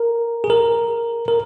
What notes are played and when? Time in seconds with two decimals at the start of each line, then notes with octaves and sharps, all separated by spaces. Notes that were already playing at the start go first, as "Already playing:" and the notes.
Already playing: A#4
0.44 G#4
0.50 A#4
1.28 A#4